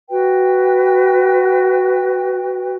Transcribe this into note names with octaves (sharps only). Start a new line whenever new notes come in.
F#4 B4 G5